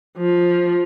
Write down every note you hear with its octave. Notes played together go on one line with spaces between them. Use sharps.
F3